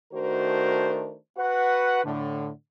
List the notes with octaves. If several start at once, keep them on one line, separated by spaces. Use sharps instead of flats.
D#3 A3 D4 F#4 A#4 C5
F#4 B4 F#5
A2 D3